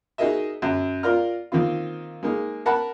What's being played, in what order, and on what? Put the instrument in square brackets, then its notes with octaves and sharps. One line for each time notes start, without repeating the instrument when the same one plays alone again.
[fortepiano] D#4 F#4 G#4 A#4 D#5 E5
F#2
F4 A#4 D5 A#5 F6
D#3 A#3 C4 F4
G#3 A#3 D#4
A#4 F#5 A5 B5